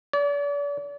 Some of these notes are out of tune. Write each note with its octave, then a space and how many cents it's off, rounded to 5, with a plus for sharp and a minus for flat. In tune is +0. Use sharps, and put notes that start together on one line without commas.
D5 -40